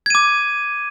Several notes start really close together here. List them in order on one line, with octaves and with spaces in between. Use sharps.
G#6 D#7 D6